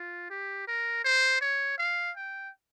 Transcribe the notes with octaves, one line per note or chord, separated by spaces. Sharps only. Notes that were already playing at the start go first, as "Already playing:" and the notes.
Already playing: F4
G4
A#4
C5
C#5
F5
G5